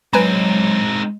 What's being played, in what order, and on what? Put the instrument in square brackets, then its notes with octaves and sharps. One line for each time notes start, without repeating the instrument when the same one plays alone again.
[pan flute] F#3 [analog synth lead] G#3 [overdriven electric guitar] C4 D#4 [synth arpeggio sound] B4 G#5 A#5